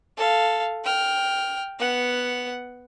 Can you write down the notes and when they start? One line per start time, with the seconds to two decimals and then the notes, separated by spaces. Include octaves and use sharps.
0.17 A4 F5
0.84 G5 F6
1.79 B3 F#5